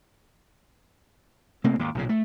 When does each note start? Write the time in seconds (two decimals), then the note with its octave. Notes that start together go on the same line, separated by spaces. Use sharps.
1.64 C3 A3 A#3 C4
1.79 D#2 G#2
1.95 B1 A#2 C#3
2.09 A3